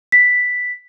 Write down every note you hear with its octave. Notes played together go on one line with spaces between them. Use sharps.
B6